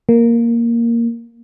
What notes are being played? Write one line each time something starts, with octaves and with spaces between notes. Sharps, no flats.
A#3